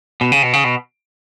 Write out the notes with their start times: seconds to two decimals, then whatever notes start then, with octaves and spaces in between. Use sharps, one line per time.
0.21 B2
0.32 C#3
0.43 B2
0.53 C#3
0.64 B2